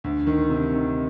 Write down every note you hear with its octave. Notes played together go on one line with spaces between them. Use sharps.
D2
D#3
C3
D#3